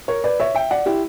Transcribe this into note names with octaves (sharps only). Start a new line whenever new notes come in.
A#4 C#5
B4 D5
C#5 E5
E5 G5
D5 F#5
E4 G4